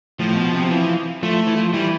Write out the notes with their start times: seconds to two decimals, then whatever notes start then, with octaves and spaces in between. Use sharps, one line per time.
0.19 A2 F3
0.36 B2
0.54 C3
0.70 E3
1.23 F3 A3
1.47 E3
1.57 F3
1.73 E3 G3